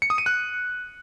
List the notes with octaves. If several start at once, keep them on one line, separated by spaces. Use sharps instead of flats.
C#7
D#6
D#7
F#6